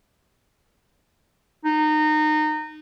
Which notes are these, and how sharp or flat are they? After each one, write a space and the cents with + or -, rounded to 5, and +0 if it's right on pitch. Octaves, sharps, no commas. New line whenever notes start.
D#4 -25